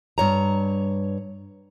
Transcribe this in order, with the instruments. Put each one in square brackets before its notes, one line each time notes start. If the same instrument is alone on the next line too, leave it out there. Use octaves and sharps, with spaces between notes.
[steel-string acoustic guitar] G2 C#5 A#5